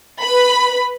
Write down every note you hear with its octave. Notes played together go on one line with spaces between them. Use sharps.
B4 B5